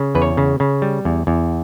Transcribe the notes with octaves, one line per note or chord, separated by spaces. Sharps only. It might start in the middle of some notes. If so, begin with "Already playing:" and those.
Already playing: C#3
E2 B4
C#5
C#3
C#3
G3
E2
E2